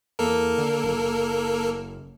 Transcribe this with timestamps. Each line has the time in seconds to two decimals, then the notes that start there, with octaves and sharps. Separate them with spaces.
0.19 E2 A#3 A4 A#4
0.58 D3
0.84 F#1